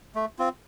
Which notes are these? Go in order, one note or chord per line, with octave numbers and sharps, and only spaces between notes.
A3
C4 F4